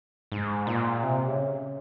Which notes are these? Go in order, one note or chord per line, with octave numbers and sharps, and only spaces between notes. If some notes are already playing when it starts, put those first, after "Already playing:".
G#2
A#2
C3
C#3